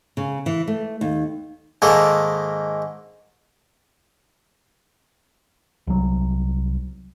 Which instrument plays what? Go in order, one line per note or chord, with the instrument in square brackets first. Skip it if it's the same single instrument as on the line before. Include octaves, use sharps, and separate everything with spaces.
[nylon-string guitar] C#3
E3
A3
D#2
[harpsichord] G#2 D#3 G#3 A#3 A4
[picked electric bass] C2 F#3